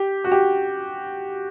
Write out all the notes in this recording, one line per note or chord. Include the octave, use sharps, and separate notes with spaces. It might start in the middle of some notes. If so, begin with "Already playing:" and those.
Already playing: G4
F#4
G4